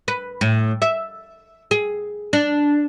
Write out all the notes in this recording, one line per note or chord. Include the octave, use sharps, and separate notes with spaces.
B4
A2
E5
G#4
D4